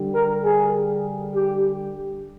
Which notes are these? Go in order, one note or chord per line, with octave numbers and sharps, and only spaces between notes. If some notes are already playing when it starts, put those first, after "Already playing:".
Already playing: D3 G3
A#4
G#4
G4